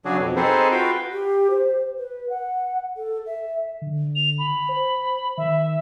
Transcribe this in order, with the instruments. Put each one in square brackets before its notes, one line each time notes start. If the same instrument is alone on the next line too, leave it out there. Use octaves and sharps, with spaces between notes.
[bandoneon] C#3 F#3 D4 F#4 G#4
F2 B2
C4 D#4 G#4 A4 B4 C5
F4 F#4 B4 F5 G5
[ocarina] G4
C5
B4
F#5
A4
E5
[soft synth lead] D3
[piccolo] F7
B5
[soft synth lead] C5
[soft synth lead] D#3 [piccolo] E5